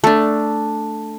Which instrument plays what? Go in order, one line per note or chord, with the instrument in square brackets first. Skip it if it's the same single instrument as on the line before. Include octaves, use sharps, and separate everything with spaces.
[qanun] A3 D4